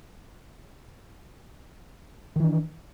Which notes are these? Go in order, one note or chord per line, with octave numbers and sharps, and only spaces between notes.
D#3 E3 D4